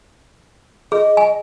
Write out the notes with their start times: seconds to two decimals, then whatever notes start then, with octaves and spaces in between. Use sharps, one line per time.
0.92 G#4 D#5
1.17 G#5